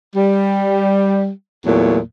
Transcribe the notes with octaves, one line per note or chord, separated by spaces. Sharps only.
G3
E2 A#2 F#3 A3